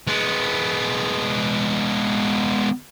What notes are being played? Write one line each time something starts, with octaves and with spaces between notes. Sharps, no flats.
G#3 B3